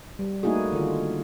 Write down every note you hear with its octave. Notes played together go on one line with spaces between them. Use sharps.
G3
A3 A#3 D#4 E4 F#4 G#4
D3 D#3 F4